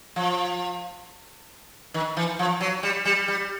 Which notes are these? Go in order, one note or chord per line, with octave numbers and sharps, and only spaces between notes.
F3
D#3
E3
F3
F#3
G3
G3
G3